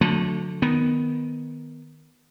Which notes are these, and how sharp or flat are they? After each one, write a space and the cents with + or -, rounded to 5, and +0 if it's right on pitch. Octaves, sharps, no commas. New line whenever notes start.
D3 -20 F#3 -35 A3 +0
D#3 +0 B3 +0